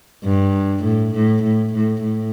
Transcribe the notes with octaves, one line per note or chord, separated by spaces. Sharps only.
G2
A2
A2
A2
A2
A2